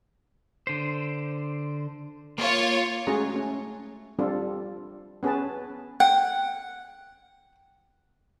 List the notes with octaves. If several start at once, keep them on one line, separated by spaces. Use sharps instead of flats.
D3 C5
A#3 F4 C#5
G#3 A3 C#4 F#4 G#4 A#5
A3 C#4
G3 C4 D4 F4 A4
B3 C#4 G#4 B4 A5
F#5 G5